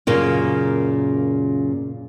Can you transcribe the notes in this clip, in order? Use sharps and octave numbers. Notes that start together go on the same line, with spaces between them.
F#2 A#2 C#3 A#3